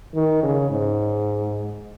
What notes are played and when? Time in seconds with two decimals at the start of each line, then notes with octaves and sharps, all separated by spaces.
0.15 D#3
0.43 C#3
0.71 G#2